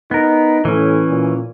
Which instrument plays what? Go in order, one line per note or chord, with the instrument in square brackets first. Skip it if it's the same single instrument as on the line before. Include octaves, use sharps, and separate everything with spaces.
[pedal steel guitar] B3 A#4 [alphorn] D#4
[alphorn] A2 [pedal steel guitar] E3 C#4
[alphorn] A#2